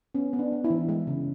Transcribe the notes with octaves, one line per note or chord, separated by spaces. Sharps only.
B3 C#4
B3
D4
B3
E4
E3
G#3
C#3